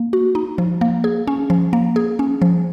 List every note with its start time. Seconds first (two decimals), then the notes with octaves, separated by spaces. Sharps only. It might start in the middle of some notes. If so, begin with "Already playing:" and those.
Already playing: A#3
0.13 F#4
0.35 D#4
0.58 F3
0.81 A#3
1.04 G#4
1.27 C#4
1.50 F3
1.73 A#3
1.96 G#4
2.19 C#4
2.42 F3